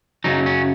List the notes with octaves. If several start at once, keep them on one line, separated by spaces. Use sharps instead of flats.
F#2 C#3 F#3 D#4
C#4